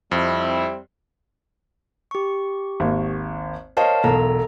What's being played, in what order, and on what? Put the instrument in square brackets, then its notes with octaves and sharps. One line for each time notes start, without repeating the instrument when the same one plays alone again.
[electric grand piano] F2 [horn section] G3 C4 E4
[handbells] G4 C#6
[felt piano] G#1 D#2
[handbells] A#4 F5 A5 [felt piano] C5 C#5 D#5
[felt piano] E1 B1 [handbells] A4 A#5